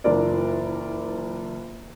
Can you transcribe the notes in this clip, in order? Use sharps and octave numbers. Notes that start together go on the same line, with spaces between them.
F#1 E3 D4 F4 A#4 D5